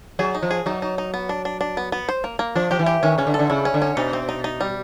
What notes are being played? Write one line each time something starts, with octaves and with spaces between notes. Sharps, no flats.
F#3 G#4
D#4
F3
G#4
F#3 D#4
D#4
D#4
B3
D4
D4
D4
B3
B3
C5
A#3
A#3
F3 D4
F3 G4
E3
G4
D#3 C#4
C#3 C#4
D3
A4
D3
C#3 E4
C#4
D3
C#4
B2 D#4
C4
D#4
D#4
G3